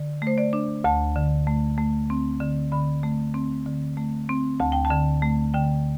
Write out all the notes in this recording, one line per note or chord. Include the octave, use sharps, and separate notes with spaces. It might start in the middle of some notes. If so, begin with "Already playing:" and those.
Already playing: D3
A3 C5
D5
D4
D2 A5
D3
A3
A3
C4
D3
D3 B5
A3
C4
D3
A3
C4
D2 A5
G5
A5
D3
A3
D3 G5